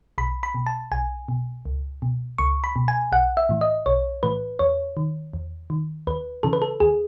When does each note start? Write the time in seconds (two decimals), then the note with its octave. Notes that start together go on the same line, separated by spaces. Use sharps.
0.18 B1 B5
0.43 B5
0.55 B2
0.66 A5
0.92 B1 G#5
1.28 B2
1.65 C#2
2.02 B2
2.38 C#2 C#6
2.64 B5
2.76 B2
2.88 G#5
3.12 B1 F#5
3.37 E5
3.49 A2 E3
3.61 D#5
3.86 B1 C#5
4.23 A2 E3 B4
4.59 E2 C#5
4.97 D#3
5.33 E2
5.70 D#3
6.07 D#2 B4
6.43 C#3 E3 A4
6.53 B4
6.62 A4
6.80 D#2 G#4